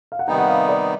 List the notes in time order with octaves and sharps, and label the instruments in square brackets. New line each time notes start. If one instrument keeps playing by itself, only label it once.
[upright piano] F5
F#5
[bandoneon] C3 D#3 G3 B3 D#4 [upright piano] G5
[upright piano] F#5
F5
D5